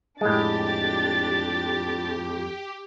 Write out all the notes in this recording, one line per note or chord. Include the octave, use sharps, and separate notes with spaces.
F2 A2 G#3 D4 G4 A6